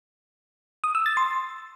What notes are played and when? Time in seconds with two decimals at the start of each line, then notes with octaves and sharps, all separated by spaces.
0.84 D#6
0.95 E6
1.06 A6
1.17 C6